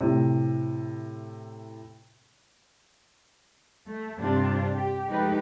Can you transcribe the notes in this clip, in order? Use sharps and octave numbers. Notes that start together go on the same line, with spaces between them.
A2 C3
A3
G2 C3 C4 D4 F4
G4
F3 G#3 A3 D#4 G4 B4